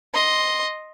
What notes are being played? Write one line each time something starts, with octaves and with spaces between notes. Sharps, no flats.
D#5 C6